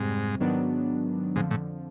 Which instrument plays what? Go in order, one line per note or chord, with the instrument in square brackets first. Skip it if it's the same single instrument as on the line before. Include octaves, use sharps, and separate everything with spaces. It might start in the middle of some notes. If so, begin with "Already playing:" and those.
Already playing: [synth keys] F2 C3 G3 C4 [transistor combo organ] G#2
[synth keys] G#2 D#3 F#3 B3 D4
[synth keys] F2 D3 F3 [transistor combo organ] G#2
[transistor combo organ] A2